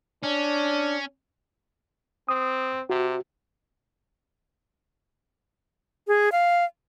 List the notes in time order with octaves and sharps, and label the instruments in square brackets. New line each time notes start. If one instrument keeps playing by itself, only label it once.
[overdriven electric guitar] C#4 [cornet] D4
[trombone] C4 [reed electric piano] D#6
[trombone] C3 [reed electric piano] F#4
[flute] G#4
F5